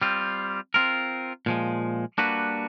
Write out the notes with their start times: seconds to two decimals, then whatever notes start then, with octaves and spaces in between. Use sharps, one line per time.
0.02 G3 C4 F4
0.74 C4 F4 A#4
1.46 A#2 F3 G#3
2.18 G3 A#3 D4 F#4 B4